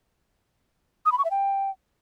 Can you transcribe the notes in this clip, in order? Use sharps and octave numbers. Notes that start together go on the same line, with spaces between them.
D#6
B5
C#6
E5
G5